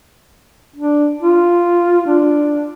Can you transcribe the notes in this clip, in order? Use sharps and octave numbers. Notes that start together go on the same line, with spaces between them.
D4
F4
D4